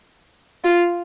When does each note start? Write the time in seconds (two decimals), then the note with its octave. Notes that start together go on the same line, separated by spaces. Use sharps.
0.64 F4